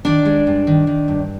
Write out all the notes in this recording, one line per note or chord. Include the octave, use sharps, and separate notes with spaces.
D#3 D4 D5
G#3
G2
D#3
D#3
G2